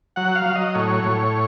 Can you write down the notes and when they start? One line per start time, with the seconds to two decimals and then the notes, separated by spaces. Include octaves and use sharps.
0.16 F#3 F#5
0.35 F5
0.46 F#3
0.55 D#5
0.74 A2 C#5
1.04 A2